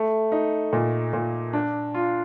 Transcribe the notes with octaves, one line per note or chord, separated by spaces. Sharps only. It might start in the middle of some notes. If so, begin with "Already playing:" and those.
Already playing: A3
D#4
A#2
A#2
D4
F4